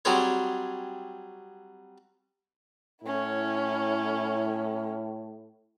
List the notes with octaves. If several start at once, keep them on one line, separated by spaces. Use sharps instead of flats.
F#3 G3 C4 G#4 C5 C#5
A2 C#4 E4